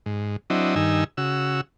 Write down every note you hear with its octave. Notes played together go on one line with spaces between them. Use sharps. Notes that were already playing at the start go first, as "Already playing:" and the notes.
G#2
F#3 C4 D4 E4 D#5
G2 D#3 D#4 G#5 E6
C#3 F#4 E6